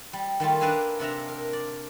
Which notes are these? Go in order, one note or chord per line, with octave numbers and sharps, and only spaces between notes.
G3
D#3 G3 A3 F4
A#3 D4 B4 E5 F5 G#5
C3 D4 E5 A#5
A#4
D5